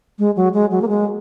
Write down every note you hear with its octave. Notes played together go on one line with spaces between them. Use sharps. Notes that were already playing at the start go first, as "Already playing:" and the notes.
G#3
F#3
G#3
F#3
A#3
G#3